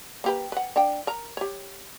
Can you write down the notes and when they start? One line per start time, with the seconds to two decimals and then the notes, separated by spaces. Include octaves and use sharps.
0.24 A#3 G4 B4
0.52 B4 F#5
0.76 D4 F5 G5
1.07 A#4 A#5
1.37 G4 C#5